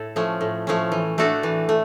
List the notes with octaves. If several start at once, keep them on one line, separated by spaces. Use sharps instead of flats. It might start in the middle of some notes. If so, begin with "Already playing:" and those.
Already playing: A2 A4
F3 A3 C#4
A2
F3 A3 C#4
E3
A3 D4 F#4 A4
E3
A3